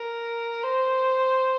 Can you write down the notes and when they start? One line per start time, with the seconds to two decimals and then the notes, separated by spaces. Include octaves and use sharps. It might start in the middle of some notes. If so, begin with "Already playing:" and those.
Already playing: A#4
0.63 C5